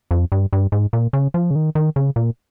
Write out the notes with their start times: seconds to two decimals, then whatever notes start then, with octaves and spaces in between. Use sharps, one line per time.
0.11 F2
0.32 G2
0.53 G2
0.72 G#2
0.93 A#2
1.13 C#3
1.34 F3
1.51 C#3
1.55 D#3
1.75 D#3
1.96 C#3
2.16 A#2